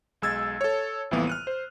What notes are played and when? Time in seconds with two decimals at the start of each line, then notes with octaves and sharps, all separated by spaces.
0.22 B1 G#3 E6 G#6 A6
0.61 A4 C#5
1.11 C2 F2 A2 E3 A#3 B3
1.27 F6 F#6 D#7
1.47 C5